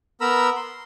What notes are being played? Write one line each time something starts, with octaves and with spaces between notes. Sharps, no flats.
B3 A#4 A#5 B5 E6
C6